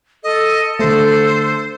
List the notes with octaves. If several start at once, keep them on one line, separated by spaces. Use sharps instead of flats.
A4 D#5
D3 A3 C5